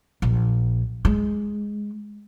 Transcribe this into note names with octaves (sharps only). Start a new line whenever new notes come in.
A#1
G#3